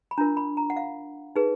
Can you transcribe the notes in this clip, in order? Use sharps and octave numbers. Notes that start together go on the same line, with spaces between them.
B5
D4 F4 A#4 A#5
B5
A#5
F#5
F5
D#4 G#4 B4